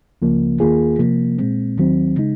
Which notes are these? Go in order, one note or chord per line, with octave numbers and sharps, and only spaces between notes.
C#2 C#3 F3 A#3
D#2 D#3 A#3 F4 G#4
C3 F3 A#3
A#2 G#3 C4
D#2 D#3 F#3 C4
C#3 G#3 D#4